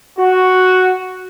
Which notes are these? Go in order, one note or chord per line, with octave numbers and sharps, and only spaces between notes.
F#4